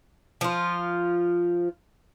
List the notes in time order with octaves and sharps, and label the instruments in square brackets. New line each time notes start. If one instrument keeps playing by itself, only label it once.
[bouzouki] F3 F4